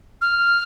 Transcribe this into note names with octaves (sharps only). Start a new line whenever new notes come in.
F6